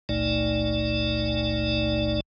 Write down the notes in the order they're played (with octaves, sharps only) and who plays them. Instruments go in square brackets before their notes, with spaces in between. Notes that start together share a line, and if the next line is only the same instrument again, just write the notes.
[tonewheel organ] G1 C#2 A#2 A3 D#4 D5